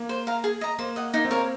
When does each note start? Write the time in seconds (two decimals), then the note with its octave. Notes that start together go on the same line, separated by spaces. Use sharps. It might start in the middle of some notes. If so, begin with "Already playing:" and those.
Already playing: A#3
0.09 C5
0.27 F5 A#5
0.44 G#4
0.61 D#5 A#5
0.79 A#3 C5
0.96 D#5 F#5
1.14 A#3 D#4
1.25 C4
1.31 A#4 C#5 F5
1.37 C4